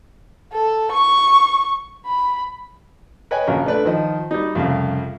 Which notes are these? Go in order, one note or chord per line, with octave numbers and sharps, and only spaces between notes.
A4
C#6
B5
B4 C#5 D#5 G5 G#5
A#1 C#3 F#4 A#4
A3 D4 B4 D5
D#3 F3 D#5
G3 D#4
C2 F2 C#3 F5